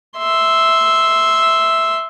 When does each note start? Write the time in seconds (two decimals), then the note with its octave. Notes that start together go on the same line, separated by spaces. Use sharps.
0.18 E5 C6